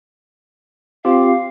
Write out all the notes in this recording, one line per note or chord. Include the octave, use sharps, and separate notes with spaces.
C4 F4 G4 F5